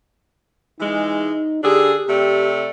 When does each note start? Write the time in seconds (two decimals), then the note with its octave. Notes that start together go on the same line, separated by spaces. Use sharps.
0.80 E3 G#3 D#4
1.63 D3 D4 G4 G#4
2.08 C3 A3 G4 D5